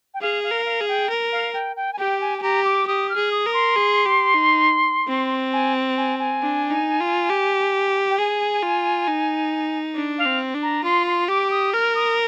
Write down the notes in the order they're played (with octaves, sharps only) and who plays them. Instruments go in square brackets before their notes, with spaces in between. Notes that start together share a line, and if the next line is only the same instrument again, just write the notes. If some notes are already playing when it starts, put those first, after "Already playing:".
[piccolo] G5
[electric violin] G#4 [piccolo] F5
[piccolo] F5
[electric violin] A#4
[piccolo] F5
[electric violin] G#4
[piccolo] G5
[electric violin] A#4
[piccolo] F5
G5
G5
G#5
[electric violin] G4 [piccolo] G5
[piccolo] G#5
G#5
[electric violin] G4 [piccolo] A#5
[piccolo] D6
[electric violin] G4 [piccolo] D#6
[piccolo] F6
[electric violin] G#4
[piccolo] D#6
[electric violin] A#4
[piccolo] C6
[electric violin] G#4
G4
D#4
C4
[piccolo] G#5
G#5
G#5
[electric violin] D4
D#4
F4
G4
[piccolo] G5
[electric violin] G#4 [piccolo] G#5
[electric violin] F4
D#4
D4
[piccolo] F5
[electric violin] C4
D4
[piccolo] A#5
[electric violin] F4 [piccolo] C6
[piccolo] C6
[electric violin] G4 [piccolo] D6
[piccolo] D#6
[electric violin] A#4 [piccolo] F6
[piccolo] D#6